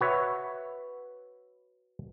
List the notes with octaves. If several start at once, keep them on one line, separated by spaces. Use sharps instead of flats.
F#4 B4 C#5 E5